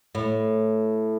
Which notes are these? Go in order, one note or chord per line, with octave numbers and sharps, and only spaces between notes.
A2